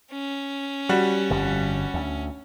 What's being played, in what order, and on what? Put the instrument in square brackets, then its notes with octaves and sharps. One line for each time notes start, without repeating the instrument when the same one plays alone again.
[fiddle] C#4
[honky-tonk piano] G3 F#4
[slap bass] G1 F2
D2